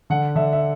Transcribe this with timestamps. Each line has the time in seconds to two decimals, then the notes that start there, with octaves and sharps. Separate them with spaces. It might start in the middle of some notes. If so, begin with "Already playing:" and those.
0.10 D3 F#5
0.36 D3 E5
0.53 E5